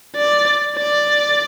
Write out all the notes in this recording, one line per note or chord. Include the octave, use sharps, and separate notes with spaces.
D5
D5